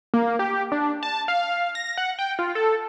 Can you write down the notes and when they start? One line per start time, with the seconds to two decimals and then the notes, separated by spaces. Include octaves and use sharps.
0.14 A#3
0.39 G4
0.72 D4
1.03 A5
1.28 F5
1.75 A#6
1.98 F#5
2.19 G5
2.39 F4
2.55 A4